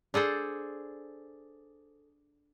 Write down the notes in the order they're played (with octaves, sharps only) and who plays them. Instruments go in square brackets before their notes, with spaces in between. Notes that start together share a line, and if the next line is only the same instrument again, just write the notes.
[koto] D4 G#4 A4 C5